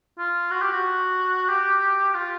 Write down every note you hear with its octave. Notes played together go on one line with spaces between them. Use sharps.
F4
F#4
G4
F#4
G4
F4